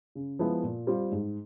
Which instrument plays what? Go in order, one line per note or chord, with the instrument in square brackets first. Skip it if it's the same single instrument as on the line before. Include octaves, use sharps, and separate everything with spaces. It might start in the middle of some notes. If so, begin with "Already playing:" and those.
[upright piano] C#3
F3 G#3 B3 E4
A#2
G3 C4 F4
G#2